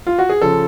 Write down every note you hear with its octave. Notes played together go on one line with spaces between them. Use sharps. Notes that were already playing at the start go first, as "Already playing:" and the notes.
F4
F#4
G#4
C#3 F3 A4